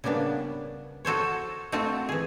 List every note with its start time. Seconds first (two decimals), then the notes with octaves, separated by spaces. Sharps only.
0.04 C#3 G3 A#3 B3 D4
1.05 F#4 A4 C5 C#5
1.72 A3 C4 F4 F#4 A4 A5
2.09 E3 G#4